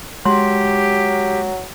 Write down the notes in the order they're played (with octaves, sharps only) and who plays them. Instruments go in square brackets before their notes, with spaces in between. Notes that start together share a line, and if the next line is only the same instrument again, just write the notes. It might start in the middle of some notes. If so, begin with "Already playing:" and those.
[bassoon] F#3 [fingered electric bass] G#3 [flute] G4 [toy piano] C6